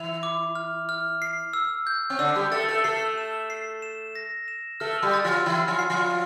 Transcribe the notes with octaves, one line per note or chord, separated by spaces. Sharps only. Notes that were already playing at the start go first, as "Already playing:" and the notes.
Already playing: E3 E4 F7
D6
F6
F6
C7
E6
G6
C4
D3 D4 E6
G3 G4
A3 A4 A6
A3 A4
A3 A4 C7
E7
C7
E7
A#6
E7
A3 A4 F6
G3 G4
A6
F3 F4
E3 E4 F6
F3 F4
C7
F3 F4